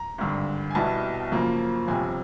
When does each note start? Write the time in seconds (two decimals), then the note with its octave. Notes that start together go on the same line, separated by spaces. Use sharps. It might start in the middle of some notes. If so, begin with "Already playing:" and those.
Already playing: A#5
0.18 G#1 G2 D3
0.71 G#5
0.75 C2 B2 G3 B3 E4 A5
1.32 F#2 C#3 F3 A#3
1.88 G1 F2 C3 G#5